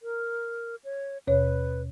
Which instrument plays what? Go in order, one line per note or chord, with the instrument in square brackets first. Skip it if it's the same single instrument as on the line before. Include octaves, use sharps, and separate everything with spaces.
[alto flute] A#4
C#5
[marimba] D#2 B2 C#5 [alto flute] B4